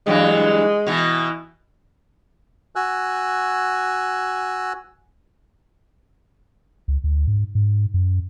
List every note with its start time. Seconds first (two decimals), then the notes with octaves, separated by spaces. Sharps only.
0.07 G2 E3 F#3 G#3
0.87 B2 E3
2.76 F#4 G#5 E6 F#6
6.88 C#2
7.04 D2
7.27 G#2
7.55 G#2
7.94 F#2